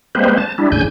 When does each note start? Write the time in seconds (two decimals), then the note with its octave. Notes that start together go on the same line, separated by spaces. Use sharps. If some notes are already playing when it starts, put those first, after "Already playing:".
0.15 G3 G#3 A#3 C4 B4 C5
0.38 A5
0.58 G3 D4 E4
0.72 D2 G#2 C#3 G#5 G6